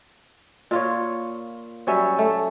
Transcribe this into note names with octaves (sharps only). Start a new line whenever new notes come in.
A#2 F4 C#5
F#3 G3 C#4 E5
A3